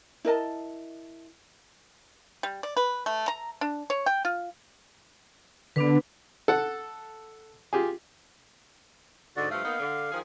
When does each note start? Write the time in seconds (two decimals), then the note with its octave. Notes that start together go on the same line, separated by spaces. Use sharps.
0.25 E4 A#4 D#5 A5
2.43 G3
2.63 D5
2.77 B4
3.06 A3
3.28 A#5
3.61 D4
3.90 C#5
4.06 G5
4.25 F4
5.76 D3 B3 D4 B4
6.48 A4 F#5
7.73 F4 G4 G#4
9.36 G#2 D3 F#4 D5
9.51 G2 F3 A3 F5
9.65 A#3 B3 D#4
9.79 D3
10.11 D#3 F3 G#4